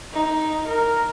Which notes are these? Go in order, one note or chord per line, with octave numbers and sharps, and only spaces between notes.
D#4
A#4